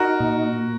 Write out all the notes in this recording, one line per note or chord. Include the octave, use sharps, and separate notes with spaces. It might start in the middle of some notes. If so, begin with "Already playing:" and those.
Already playing: D#4 F#4 A#4
A#2